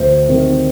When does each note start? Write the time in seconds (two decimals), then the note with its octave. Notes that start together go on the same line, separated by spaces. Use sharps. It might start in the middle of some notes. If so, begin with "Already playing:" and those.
Already playing: D2 C5
0.28 C3 D#3